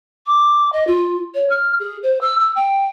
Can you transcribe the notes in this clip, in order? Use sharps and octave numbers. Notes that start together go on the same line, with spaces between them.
D6
D#5
F4
C#5
F6
G#4
C5
E6
E6
G5